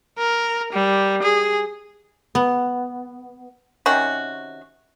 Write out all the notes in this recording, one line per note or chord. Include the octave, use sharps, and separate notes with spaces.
A#4
G3
G#4
B3
C3 D#3 C#4 F#4